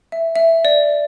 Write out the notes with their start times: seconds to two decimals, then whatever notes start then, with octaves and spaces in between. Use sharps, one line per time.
0.12 E5
0.36 E5
0.65 D5